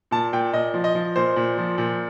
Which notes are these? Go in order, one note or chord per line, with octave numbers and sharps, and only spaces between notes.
A#2 A5
A#2 G5
A#2 D#5
F3
D#5
F3
A#2 C5
A#2
F3
A#2